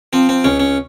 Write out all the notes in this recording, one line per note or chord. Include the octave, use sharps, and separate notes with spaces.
F3 C4
C4
C#2 C#4
C#4